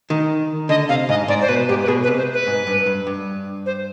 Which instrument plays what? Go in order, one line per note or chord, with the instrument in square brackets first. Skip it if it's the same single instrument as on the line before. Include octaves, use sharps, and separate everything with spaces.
[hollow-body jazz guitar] D#3
[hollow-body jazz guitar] D3 [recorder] D#5
[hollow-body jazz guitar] C3 [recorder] F5
[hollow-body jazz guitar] G#2 [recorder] D#5
[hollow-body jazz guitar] G#2 [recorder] D5
[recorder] C5
[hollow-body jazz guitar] B2 [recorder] B4
[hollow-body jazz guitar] G#2 [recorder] G4
[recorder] B4
[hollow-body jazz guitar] B2 [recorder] G#4
[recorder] B4
[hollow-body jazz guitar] C3
[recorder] C5
B4
[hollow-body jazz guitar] G#2
G2
G2
G2
[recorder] C5